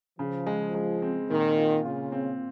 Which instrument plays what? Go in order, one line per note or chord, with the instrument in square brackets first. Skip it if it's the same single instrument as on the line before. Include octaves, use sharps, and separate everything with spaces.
[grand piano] C#3 [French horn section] F3
[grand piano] G#3
G#3
C4
[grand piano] A#2 [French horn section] D#3
[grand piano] F4
[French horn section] C#3 [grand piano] F4
[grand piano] C4